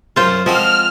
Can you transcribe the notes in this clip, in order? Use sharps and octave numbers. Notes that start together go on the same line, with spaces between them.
F#2 C#4 F4 C5
F3 G#3 C4 F#4 F6